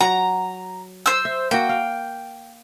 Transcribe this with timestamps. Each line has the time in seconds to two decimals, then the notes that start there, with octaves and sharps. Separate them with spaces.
0.01 F#3 A#5
1.06 C5 E6
1.25 E5
1.51 A#3 F#4 G5
1.69 F5